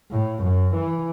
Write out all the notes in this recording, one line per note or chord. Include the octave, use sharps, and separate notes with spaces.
A2
F#2
E3